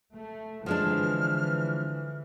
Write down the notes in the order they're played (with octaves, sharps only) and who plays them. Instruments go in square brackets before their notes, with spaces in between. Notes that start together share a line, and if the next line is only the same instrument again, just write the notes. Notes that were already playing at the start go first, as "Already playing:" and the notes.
[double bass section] A3
[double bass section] D3 E3 [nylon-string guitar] F3 G#3 D4 [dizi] F6